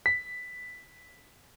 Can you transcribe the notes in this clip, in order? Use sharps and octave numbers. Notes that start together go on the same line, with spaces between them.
B6